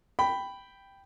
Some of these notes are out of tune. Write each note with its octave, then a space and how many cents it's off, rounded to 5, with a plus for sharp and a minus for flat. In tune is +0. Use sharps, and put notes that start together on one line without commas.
G5 +0 B5 +5